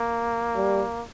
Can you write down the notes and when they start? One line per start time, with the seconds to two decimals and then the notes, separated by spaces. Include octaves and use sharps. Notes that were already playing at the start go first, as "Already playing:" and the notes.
Already playing: A#3
0.55 G3